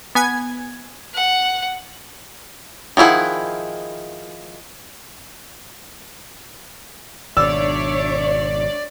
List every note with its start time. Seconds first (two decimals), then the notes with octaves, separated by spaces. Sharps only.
0.15 B3 G#5 G#6
1.14 F#5
2.97 D#3 F3 E4 G#4 F#5
7.37 G#1 B2 D4 C#5 D5 E5 E6